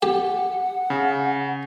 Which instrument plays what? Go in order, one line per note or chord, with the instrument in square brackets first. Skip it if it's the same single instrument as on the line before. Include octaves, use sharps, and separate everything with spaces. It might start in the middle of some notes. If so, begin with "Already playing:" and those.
[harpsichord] G4 [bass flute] F#5
[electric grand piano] C#3